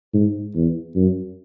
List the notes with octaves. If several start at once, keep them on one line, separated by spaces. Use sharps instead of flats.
G#2
E2
F#2